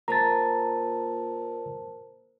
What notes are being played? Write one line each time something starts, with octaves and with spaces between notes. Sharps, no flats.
A#2 A#4 C5 A5 A#5 A6